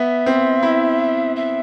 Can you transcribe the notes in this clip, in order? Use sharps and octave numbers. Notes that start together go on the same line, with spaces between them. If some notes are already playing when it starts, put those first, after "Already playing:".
Already playing: B3 E5
C4
E4
E5